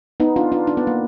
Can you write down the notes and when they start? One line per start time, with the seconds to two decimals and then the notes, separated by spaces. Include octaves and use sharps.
0.20 B3 D#4
0.36 D4 F4
0.52 D4 F4
0.67 D4
0.77 B3
0.87 A#3